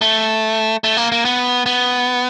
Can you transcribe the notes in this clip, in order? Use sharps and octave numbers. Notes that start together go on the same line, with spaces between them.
A3
A3
A#3
A#3
B3
B3